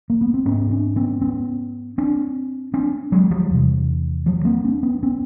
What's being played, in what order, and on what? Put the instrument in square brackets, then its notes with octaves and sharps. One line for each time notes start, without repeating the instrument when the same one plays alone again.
[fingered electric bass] A#3
B3
C4
G#2 B3 C#4
C4 D4
B3 C#4
B3 C#4
C4 D4
C4 D4
F#3 G#3
F3 G3
E2 C3
F3 G3
A#3 C4
C4 D4
B3 C#4
B3 C#4